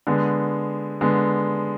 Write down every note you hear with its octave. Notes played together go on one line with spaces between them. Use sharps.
D3 G#3 B3
D3 G#3 B3